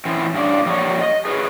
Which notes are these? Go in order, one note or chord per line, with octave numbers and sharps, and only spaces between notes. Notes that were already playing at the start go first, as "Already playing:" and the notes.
E3 C4 C#4
G2 C#4 D5
F3 G3 A#3 C#5
D#5
G#4 B4 C#5